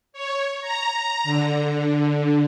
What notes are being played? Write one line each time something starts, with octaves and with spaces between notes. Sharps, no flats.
C#5
A#5
D3